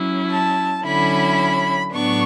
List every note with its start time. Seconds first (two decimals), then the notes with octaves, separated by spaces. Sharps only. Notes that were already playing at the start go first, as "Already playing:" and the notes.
Already playing: F#3 C#4 E4
0.31 A5
0.85 D3 F#3 C#4 E4 B5
1.93 A2 F#3 B3 D4 C#6